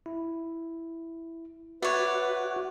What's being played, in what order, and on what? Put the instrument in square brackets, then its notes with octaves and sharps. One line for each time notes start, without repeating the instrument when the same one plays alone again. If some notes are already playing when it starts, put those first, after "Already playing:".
[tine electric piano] E4
[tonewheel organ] F#4 [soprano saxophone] B4 [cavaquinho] C#5 D5 [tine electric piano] E5